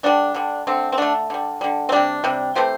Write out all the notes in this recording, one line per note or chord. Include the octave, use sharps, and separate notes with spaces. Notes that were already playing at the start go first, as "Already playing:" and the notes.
D3 G3 D4
D3 G3
D3 A3 C4
C4
D3 A3 D4
D3 G3
D3 G3
C4
C3 G3 D4
C3 G3
C3 E3 A3 G4 C5